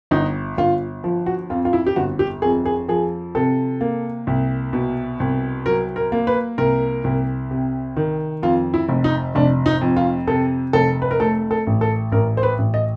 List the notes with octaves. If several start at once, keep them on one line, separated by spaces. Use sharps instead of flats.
G1 D#4
G1 F4
F3
F#4
F2 F4
F4
E4
G4
G1 F#4
G4
F2 G#4
G#4
F3 G#4
C3 A4
A#3
C2
B2
C2
F#3 A#4
A#4
A#3
B4
C2 A#4
C2
C3
D#3
F2 F4
E4
F1
D#4
F1 D4
D#4
F2
F4
C3 A4
F1 A4
B4
A#4
A3 A4
A4
A1
A4
A1 A#4
C5
B4
A1
D#5